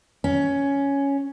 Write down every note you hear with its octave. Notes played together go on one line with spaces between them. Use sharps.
C#4